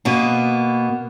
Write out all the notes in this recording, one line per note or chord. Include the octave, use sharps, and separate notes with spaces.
B2 A#3 B3